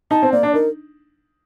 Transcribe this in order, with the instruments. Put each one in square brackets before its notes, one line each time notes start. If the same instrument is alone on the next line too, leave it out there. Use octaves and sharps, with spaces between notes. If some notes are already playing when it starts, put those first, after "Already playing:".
[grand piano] D#4 [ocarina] A5
[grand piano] C4
[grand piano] A#3 [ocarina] D5
[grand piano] D4
[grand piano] D#4 [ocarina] A#4